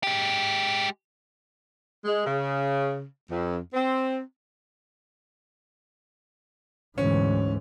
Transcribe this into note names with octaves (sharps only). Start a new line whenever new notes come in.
G#3 G4
G#3
C#3
F2
C4
D2 G#2 B2 E3 C#4